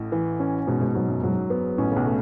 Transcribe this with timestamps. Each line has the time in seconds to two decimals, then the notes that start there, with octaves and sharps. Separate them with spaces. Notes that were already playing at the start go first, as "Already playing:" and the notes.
Already playing: A1 A2
0.12 E3
0.40 C#4
0.67 G#2 B2
0.81 G#2
0.95 G#2 F#3
1.09 F#2
1.23 G#2 F#3
1.50 B3
1.78 A1 A2 C#4
1.91 C#3
1.96 B1 B2
2.06 A3